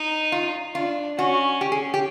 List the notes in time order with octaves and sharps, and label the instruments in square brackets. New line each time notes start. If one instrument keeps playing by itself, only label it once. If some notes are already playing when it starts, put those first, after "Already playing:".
Already playing: [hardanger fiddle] D#4
[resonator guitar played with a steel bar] F4
[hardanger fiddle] D4 [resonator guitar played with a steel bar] F4
[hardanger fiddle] C#4 [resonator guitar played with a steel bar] F#4
[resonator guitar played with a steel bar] G4
G#4
G4